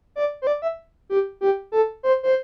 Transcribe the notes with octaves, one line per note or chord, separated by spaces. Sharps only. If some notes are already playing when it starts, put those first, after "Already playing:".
D5
C5
D5
E5
G4
G4
A4
C5
C5